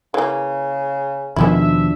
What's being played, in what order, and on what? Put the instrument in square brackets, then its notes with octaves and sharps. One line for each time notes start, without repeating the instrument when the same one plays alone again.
[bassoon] C#3 [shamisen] E3 A#3
[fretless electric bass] D#2 B2 F3 [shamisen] D#3 G#3 E4 [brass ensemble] D4 E5